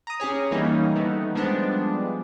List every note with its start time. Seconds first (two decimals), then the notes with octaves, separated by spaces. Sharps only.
0.07 A#5 D#6
0.20 C#4 G4 G#4 C#5
0.51 E3 G3 A#3 C#4 D#4
0.96 D#3 A3 B3 D#4
1.35 F3 G3 G#3 B3 D4